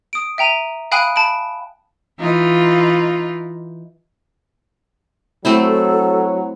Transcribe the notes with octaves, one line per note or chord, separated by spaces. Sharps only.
D#6 D7
E5 G5 A#5 D#7
F5 G5 G#5 B5 D#6 F#6
A5 B5 D7
E3 D#4 F4
F#3 A3 C4 E4 A4